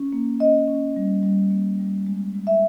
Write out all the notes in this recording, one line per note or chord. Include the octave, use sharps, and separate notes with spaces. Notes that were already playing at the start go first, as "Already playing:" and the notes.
Already playing: C#4
A#3
C#4 D#5
C#4
G3
G3
A#3
G3
G#3
G#3
E5